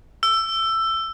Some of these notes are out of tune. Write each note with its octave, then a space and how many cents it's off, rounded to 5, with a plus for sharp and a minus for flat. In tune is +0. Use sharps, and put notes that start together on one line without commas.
E6 +15